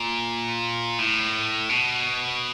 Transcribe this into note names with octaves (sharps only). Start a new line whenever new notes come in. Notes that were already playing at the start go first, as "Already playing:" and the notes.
Already playing: A#2
A2
B2